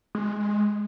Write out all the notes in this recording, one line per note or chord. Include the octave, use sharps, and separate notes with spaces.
G#3